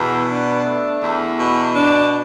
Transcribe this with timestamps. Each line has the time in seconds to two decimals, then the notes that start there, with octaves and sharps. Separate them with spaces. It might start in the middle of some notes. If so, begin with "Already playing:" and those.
Already playing: E2 B2
0.29 D4
0.65 A3
1.01 E2
1.38 B2
1.74 D4